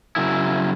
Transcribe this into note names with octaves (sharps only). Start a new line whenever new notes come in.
F#2 C#3 F#3 E4